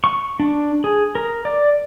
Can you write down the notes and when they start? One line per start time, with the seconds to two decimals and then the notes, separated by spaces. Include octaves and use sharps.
0.04 C#6
0.40 D4
0.84 G#4
1.15 A#4
1.45 D5